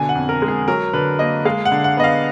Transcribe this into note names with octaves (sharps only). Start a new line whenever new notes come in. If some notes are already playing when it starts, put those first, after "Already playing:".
Already playing: B2 D3 G#5
F#5
F2
A#4
G#3
G#4
F#3 A#4
D3 B4
A#3 D#5
G#3 F5
F#5
D3
F#5
B3 D#5
F5